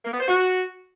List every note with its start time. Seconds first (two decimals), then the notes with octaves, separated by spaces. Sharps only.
0.04 A#3
0.12 B3
0.20 C5
0.28 F#4